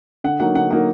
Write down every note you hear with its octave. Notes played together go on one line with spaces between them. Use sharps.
D3 F#5
F#3 A#3 D#4 F#5
D3 F#5
F#3 A#3 D#4 F#5